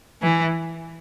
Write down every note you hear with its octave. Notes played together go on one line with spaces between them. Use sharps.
E3